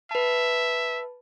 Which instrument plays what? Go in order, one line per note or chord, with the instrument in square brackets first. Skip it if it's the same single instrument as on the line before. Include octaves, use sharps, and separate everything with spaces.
[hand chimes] B4 A5 [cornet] E5